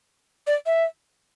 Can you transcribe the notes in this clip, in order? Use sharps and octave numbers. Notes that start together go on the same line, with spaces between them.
D5
E5